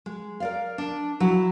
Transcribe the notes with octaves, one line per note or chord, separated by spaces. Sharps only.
G#3
A#4 D5 F5
D4
F#3 E4